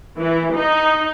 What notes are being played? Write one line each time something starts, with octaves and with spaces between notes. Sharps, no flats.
E3
D#4